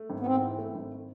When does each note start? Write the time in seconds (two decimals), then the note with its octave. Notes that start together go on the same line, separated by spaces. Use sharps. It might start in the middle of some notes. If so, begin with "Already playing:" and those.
Already playing: A3
0.10 G#1
0.20 B3
0.26 G#2 C4
0.42 E3
0.58 A3
0.75 G#1